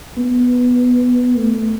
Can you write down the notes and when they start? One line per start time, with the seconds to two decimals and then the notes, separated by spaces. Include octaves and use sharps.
0.17 B3
1.37 A3